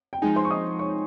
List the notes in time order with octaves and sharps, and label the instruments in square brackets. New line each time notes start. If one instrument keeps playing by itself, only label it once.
[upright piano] G5
[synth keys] F3 G#3 D#4 [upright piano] G#4 G#5
[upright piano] C5 C6
C#6
D#5 D#6
C#5 C#6